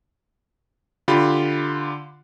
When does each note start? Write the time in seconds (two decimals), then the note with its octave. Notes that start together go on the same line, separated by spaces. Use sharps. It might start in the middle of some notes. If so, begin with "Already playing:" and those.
1.08 D3 F4 G4 B5